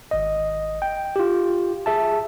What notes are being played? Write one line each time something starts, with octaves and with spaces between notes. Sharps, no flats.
G#1 D#5
G5
F4 G4
G#4 E5 A5